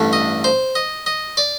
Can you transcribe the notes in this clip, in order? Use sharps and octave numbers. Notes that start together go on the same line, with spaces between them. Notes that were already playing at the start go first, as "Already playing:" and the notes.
Already playing: A1 G2 D3 A3
D#5
C5
D#5
D#5
D5